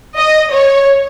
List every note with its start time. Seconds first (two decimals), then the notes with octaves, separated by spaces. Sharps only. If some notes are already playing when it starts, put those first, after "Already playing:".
0.17 D#5
0.53 C#5